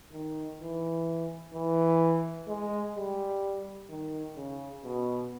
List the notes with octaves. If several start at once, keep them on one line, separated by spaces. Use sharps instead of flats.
D#3
E3
E3
G#3
G3
D#3
C#3
B2